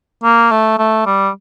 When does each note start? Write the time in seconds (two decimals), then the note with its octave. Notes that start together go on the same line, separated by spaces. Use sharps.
0.23 A#3
0.51 A3
0.78 A3
1.06 G3